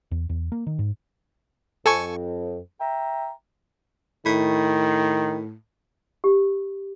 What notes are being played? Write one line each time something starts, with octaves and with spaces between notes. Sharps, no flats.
E2
E2
A#3
D#3
G#2
F2 A4 G#5 C#6
E5 G5 A#5
A2 D#3
G4